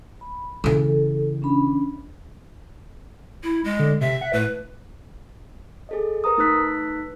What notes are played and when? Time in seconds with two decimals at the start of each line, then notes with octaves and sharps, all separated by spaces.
0.21 B5
0.64 C#3 E3 A4
1.42 C#4 D4 B5
3.43 E4
3.64 G#3
3.79 D3
4.01 C3 E5
4.21 F#5
4.33 A2 B4
5.89 G#4 A4 D#5
6.24 A#4 B4 A#5 D#6
6.38 A3 D#4 B4 E6 F#6 B6